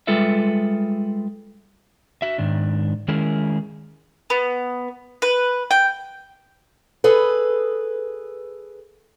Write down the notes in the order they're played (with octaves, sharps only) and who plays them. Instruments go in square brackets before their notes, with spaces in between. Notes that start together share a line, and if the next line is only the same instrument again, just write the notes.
[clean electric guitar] G3 G#3 F4 A4 B4 E5
[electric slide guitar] F#4 E5
G#2 D#3 D4
D#3 G#3 C#4 E4 G#4 A#4
[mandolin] B3
B4
G5
[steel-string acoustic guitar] G#4 A4 B4